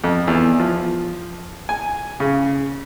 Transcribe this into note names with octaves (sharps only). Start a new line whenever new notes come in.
F2
E2
F3
G#5
C#3